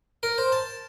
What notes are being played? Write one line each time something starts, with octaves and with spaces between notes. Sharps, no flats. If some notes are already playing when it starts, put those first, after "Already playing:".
A#4
C5
A5